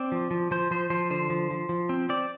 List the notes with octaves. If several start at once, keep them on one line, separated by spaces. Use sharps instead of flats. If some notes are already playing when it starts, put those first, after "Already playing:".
Already playing: C4 D5
F3
F3
F3 C5
F3 C5
F3 C5
D3 C5
F3
F3
F3
C4
C4 D5